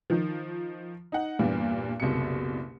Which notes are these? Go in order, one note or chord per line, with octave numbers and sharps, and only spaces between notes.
D#3 F3
D#4 F#5
E2 G2 A#2 E3
F#1 C2 B2 C#7